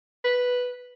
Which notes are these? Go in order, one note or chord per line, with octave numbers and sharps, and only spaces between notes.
B4